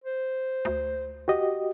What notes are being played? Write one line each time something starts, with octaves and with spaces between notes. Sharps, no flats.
C5
D2
F#4 G4 D#5